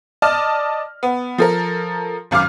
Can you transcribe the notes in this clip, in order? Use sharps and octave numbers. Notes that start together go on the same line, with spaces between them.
D5 D#5 A5 F6
B3
F3 A4 A#4
G#1 F#2 F5 D6 F6